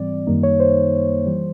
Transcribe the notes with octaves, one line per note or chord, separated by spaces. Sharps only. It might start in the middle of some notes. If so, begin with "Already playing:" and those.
Already playing: G#2 E3 G3 C4 D5
F#2 D#3 G3 A#3 D#4
C#5
C5
E3 G3